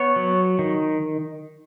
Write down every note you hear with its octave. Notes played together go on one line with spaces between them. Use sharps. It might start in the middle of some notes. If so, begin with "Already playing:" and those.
Already playing: B3 C#5
F#3
D#3